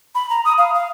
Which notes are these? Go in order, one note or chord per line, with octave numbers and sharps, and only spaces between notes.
B5
A#5
D#6
F5
F5